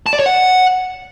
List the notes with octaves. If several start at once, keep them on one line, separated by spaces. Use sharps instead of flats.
A5
D5
C#5
F#5